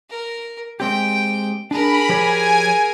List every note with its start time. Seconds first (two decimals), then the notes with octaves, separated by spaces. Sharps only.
0.10 A#4
0.80 G#3 C4 G4 G5
1.71 D4 G#4 A#4 B5
2.09 F3 G4 C#5 G#5